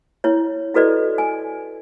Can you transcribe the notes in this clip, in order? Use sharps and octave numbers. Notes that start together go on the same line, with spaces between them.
E4 C#5
E4 F#4 A4 B4 D5 D#5
G#5